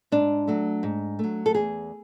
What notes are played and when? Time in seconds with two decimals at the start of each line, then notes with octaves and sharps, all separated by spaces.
0.12 G#2 D4
0.48 F#3 A3
0.83 G#2
1.19 F#3 A3
1.46 A4
1.54 E2 G#4